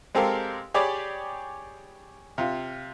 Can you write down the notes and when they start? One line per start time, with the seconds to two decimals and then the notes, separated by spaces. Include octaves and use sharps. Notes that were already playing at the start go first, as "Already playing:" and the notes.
0.15 G#3 C4 G4 A4 A#4 F5
0.74 G4 G#4 C#5 D5 B5 D6
2.38 C3 F4